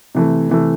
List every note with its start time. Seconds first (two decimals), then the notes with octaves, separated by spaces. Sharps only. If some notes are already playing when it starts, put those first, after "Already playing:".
0.15 C3 E3 A3
0.49 C3 E3 A3